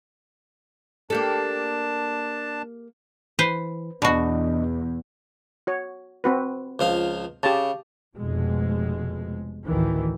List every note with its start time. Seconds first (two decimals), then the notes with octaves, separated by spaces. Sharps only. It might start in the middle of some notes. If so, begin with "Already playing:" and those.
1.10 A#3 D4 G4 A4 A5
3.39 E3 B4 C5
4.02 E2 B2 D4 F#4 D#5
5.67 F#4 C#5
6.24 C4 F#4 B4
6.79 C#2 F3 F5
7.43 C#3 G4 A5
8.15 F1 F2 B2 G#3
9.66 A1 D2 D#3 E3